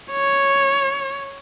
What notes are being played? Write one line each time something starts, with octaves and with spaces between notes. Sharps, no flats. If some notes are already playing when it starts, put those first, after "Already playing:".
C#5